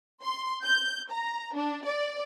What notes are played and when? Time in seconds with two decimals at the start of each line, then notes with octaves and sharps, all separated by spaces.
0.22 C6
0.63 G6
1.10 A#5
1.54 D4
1.85 D5